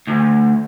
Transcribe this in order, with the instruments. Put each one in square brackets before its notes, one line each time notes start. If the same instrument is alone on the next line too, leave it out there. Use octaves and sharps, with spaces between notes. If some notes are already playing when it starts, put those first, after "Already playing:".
[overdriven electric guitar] D2